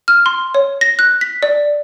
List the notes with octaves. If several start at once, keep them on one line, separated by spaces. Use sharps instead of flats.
F6
C6
C#5
A#6
F#6
B6
D5